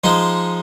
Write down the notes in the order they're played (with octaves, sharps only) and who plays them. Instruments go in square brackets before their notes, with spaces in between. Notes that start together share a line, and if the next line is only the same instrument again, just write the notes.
[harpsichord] F3 G#3 D#4